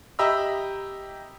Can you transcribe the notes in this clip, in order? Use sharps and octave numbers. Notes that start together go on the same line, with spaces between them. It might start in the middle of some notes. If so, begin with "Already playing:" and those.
G4 D#5 E5 A#5 B5 E6